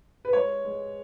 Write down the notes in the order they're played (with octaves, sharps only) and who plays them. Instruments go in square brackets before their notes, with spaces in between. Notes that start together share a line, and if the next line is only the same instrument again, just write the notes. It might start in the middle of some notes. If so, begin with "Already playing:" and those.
[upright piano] B4
G#3 C#5
G#3